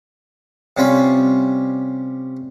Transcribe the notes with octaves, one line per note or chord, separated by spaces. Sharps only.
C3 G3 C#4 F4 B5